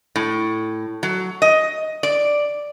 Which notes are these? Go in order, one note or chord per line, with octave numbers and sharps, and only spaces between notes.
A2
F#3
D#5
D5